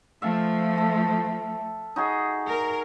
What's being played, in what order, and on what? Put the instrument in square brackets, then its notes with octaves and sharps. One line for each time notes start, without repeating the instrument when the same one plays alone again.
[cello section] F3 A3 [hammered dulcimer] E5 F5 A5
[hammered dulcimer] A4
D#4 F#4 G#4
[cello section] A#4